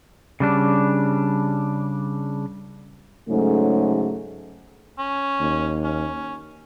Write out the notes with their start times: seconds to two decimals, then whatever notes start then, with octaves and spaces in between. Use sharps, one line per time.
0.40 C#3 G3 D4
3.29 G#2 C#3 F#3 A3
4.99 C#4
5.40 D#2
5.84 C#4